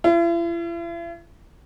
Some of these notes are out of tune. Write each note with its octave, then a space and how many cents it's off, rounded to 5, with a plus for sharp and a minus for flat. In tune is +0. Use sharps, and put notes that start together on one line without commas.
E4 +45